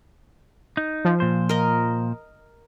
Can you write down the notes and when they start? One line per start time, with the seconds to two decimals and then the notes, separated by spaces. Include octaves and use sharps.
0.77 D#4
1.05 F3
1.20 A#2 C5
1.49 A#4 D#5